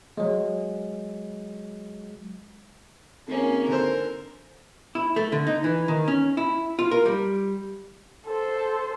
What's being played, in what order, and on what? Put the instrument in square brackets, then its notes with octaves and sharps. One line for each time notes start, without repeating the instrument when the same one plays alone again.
[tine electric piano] F#3 G#3
[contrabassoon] G#1 [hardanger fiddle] A#3 C#4
[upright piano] D3 A4 C5 [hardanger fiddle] A#4
[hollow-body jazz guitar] E4
A3
D3
D#4
E3
D#3
C#4
E4
F4
A#4
G3
[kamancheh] A4 C5